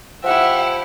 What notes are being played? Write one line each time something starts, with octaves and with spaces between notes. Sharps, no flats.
F3 E4 G4 E5 F#5